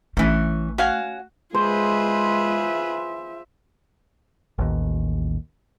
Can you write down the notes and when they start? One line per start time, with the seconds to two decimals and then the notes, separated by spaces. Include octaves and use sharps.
0.17 A1 E3 A3 C#4
0.78 C#4 F#4 F5 G#5
1.55 G#3 F4 G#4 B4 C5 E5
4.58 A1 D#2